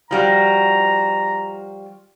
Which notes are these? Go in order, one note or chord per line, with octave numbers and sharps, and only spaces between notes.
F3 G3 F#4 A#5